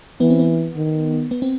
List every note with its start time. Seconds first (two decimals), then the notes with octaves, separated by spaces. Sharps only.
0.20 E3 B3
0.30 C4
0.39 B3
0.76 D#3
1.31 B3
1.42 C4